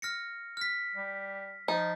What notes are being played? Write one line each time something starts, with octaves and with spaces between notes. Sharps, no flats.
F6 A#6 C#7
F6 B6
G3
F3 D#4